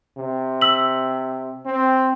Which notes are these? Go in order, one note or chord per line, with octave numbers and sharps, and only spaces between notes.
C3
E6 B6 F#7
C4